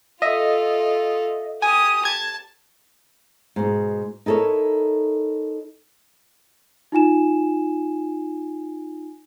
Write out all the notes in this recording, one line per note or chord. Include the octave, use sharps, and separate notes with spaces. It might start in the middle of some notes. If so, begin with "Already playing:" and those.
F4 A4 D#5 E5
G4 G#5 D#6
A5 G#6
G#2 B2
D#4 E4 A4 A#4 C#5
D#4 F4 G#5 E7